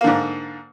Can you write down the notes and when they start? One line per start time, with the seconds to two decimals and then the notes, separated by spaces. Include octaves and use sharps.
0.01 A#3
0.04 D3
0.07 G#2